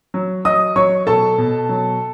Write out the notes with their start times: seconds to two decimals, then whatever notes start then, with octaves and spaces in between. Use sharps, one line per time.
0.14 F#3
0.45 F#3 D#5 D#6
0.76 F#3 C#5 C#6
1.07 B2 A4 A5
1.38 B2
1.69 F#3